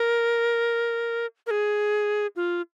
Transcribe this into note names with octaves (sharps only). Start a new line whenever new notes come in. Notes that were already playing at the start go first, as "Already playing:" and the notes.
Already playing: A#4
A#4
G#4
F4